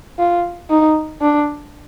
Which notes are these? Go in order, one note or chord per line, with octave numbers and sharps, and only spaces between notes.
F4
D#4
D4